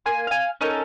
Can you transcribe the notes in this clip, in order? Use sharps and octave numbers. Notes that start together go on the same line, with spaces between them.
A#3 G#5 C6
F5 G#5
C#4 D#4 A4 A#4